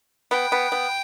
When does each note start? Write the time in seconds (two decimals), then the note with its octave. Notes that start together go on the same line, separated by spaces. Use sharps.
0.31 B3 G5
0.52 B3
0.72 B3